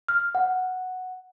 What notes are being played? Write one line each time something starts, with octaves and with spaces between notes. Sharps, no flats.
F6
F#5